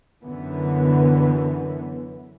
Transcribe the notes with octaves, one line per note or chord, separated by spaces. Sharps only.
F#2 D3 E3 B3